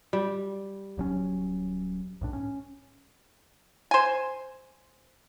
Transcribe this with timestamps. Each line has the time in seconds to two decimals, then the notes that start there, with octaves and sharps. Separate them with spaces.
0.13 G3
0.97 D1 F#3 C#4
2.21 B1 A2 D4
2.33 C#4
3.91 C5 G#5